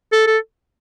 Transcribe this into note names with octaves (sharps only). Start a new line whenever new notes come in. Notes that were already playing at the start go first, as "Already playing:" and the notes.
A4
A4